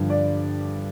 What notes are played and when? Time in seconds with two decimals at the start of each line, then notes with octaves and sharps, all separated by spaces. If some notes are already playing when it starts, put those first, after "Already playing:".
Already playing: G2 D3 F3
0.10 D5